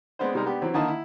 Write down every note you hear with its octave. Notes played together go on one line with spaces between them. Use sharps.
G#3 B3 C4 D4 C5
C3 G3 G#3 D#4 A#4
B3 D4 G4
E3 F#3 C4
D3 D#3 A#3 E4 D#5 A5
E4